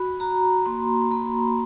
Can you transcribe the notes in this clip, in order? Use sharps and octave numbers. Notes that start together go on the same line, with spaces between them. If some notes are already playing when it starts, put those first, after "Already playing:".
Already playing: F#4 B5
F#4 A#5
A#3 C6
A#3 B5